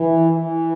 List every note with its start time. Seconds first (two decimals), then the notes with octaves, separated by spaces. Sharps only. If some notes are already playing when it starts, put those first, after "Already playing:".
Already playing: E3
0.31 E3